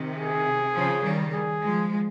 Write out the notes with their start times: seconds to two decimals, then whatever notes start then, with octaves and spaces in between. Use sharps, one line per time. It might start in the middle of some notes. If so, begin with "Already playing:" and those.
Already playing: C3 D#3
0.16 G#4
0.75 C#3 F3
1.04 D#3 G3
1.33 G#4
1.63 F3 G#3